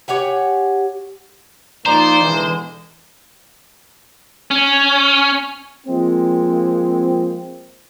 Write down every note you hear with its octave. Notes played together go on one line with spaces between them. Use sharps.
G4 C#5 F#5 G#5
F3 A#3 D#4 C5 D5 A#5
B2 D3 E3 G#3
C#4
F3 G#3 A#3 C4